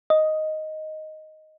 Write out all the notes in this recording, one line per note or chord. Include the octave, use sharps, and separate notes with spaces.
D#5